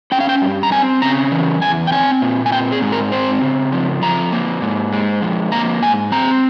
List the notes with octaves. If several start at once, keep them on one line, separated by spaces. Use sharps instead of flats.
C#4 G5
F5
G5
G2
A#5
C4 G#5
C#3 A#5
E3
E2 G#5
G5
C4 G#5
A#2
G#5
C4 G5
G#4
G#2
A#4
C4 C5
C#3
F3
F2 A#5
A#3
G#2
G#3
F2
A#3 A#5
G#2 G#5
C4 A#5